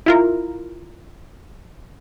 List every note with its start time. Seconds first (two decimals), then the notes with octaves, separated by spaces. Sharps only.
0.06 E4 F4 A#4